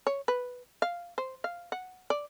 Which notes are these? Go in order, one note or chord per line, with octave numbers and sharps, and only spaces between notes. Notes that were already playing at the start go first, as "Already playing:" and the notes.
C#5
B4
F5
C5
F5
F#5
D5